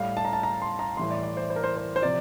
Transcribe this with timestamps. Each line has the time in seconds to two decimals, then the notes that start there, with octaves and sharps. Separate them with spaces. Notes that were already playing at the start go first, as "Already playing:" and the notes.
Already playing: A2 G3 F5
0.17 A5
0.25 A#5
0.33 A5
0.43 A#5
0.62 C6
0.79 A#5
0.97 A2 E3 G3 C6
1.11 D5
1.23 D5
1.37 C5
1.50 C5
1.56 A#4
1.64 C5
1.77 C5
1.96 C5
2.02 C3 F3 D5